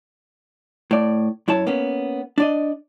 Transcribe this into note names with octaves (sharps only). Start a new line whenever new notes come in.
A2 D5
F#2 E4 C#5 A5
A#3 B3 C#4
D4 D5 D#5